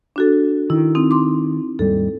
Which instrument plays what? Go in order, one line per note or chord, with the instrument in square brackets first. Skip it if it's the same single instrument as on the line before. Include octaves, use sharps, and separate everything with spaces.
[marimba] D4 F#4 A4
[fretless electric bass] D#3 [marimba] E4
[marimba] C4 D#4
C6 D6
[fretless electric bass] D#2 G#2 G3 [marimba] A4